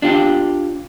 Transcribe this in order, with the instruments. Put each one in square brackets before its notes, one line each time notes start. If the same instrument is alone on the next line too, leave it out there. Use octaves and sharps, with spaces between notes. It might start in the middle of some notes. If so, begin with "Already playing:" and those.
[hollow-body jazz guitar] D4 F4 G4